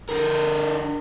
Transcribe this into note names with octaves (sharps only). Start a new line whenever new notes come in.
D3 A#4